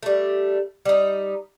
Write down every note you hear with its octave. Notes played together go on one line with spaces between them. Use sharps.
G3 A3
G3 D#4